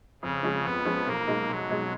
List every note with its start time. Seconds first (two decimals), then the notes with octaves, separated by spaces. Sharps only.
0.22 F2 C#3
0.43 F3 G#3 C#4
0.64 F2 B3
0.85 F3 G#3 C#4
1.07 B1 A#3
1.27 B2 G#3 D#4
1.49 B1 F#3
1.70 B2 G#3 D#4